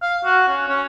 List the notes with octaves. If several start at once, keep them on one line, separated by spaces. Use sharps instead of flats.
F5
F#4
C#4
C#4